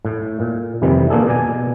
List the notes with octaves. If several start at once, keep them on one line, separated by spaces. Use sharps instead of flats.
A2
A#2
F2 C3 D#3 E3 G3
A#2 A#3 D4 G#4 A4
B2 D5 G#5